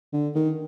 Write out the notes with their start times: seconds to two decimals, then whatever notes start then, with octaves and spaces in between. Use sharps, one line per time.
0.13 D3
0.35 D#3